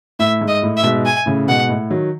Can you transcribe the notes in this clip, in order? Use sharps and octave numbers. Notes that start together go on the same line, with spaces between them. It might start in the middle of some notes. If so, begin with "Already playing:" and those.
A2 E5
G#2
D#5
A2
E5
G#2 B2
G#5
A2 C#3
G#2 B2 F#5
A2
D#3 F#3